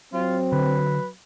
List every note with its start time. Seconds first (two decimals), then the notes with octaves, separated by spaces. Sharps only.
0.13 F#3 C4 F4
0.52 D3 B4